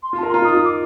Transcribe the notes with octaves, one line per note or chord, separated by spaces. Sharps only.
C6
F4 A5
A#4
C6
F4 A#5
D#4 D#6
F4
D#6
D6